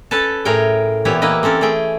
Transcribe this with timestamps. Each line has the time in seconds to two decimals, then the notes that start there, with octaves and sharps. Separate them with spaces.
0.11 C#4 A4 B4 C#5 A5
0.45 A2 G#4 A#4 C#5 G5
1.05 A#2 E3 B3 E4 G4 C#5
1.22 E3 A#3 E4 B4 D#5
1.43 C4 C#4 A4 A#4
1.61 A3 C#4 G#4 G5